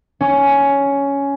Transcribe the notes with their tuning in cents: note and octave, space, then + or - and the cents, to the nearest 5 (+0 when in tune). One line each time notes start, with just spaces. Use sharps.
C#4 +10